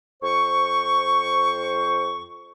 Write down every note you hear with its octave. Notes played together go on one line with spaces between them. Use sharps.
F2 C5 C#6